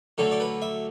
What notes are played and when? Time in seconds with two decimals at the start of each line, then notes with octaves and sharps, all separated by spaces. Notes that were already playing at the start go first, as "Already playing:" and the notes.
0.18 D2 D3 F#3 A4
0.31 D5
0.40 B4
0.62 E5